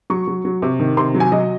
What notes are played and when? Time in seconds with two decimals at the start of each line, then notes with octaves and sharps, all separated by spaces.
0.10 F#3 C#6
0.27 F#3
0.45 F#3
0.62 C3
0.80 D#3
0.97 C3 C6
1.15 F#3
1.20 G#5
1.32 F#3 D#5